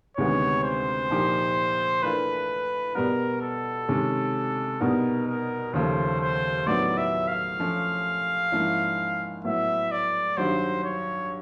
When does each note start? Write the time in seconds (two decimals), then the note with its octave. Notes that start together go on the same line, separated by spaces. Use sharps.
0.17 D2 C3 D#3 G#3 B3 C#5
0.64 C5
1.10 A#2 F3 A#3 D#4 G4
2.03 E3 A3 D4 F4 A#4 B4
2.95 B2 G3 B3 A#4
3.42 A4
3.88 C3 D#3 G#3 C#4
4.81 B2 G3 B3 D#4 A#4
5.27 A#4
5.73 D#2 C#3 F3 A3 C5
6.20 C5
6.66 A2 F#3 B3 D#4 D5
6.98 E5
7.28 F5
7.60 F3 A3 C#4
8.52 G#2 F3 A#3 C#4 E4
9.44 A2 F#3 B3 E4 E5
9.92 D5
10.37 G2 D#3 F#3 C5
10.84 C#5